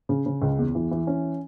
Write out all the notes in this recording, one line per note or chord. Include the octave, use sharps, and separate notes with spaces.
C#3
C#3
C#2
E2
E3
E3
C#4